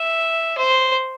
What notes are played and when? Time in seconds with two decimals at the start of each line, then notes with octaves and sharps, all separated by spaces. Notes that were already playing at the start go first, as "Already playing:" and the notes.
Already playing: E5
0.57 C5